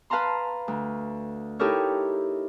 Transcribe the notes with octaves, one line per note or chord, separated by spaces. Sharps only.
B4 F5 A5 A#5 C6
D2
D#4 E4 G4 A4 A#4 C#5